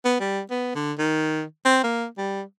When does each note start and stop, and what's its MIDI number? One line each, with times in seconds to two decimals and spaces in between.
0.05 0.16 59
0.20 0.41 55
0.51 0.71 59
0.75 0.93 50
0.98 1.42 51
1.65 1.78 60
1.83 2.06 58
2.18 2.42 55